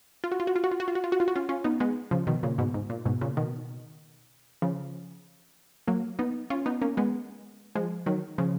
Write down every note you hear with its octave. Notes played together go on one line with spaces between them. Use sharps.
F4
F#4
F4
F#4
F4
F#4
F4
F#4
F4
F#4
F4
F#4
F4
F#4
C#4 F4
C#4 F4
B3 D#4
G#3 B3
C#3 F3
B2 D#3
A#2 C#3
G#2 B2
G#2
A#2
G#2 B2
A#2 C#3
B2 D#3
C#3 F3
F#3 A#3
B3 D#4
C#4 F4
B3 D#4
A#3 C#4
G#3 B3
F3 G#3
D#3 F#3
C#3 F3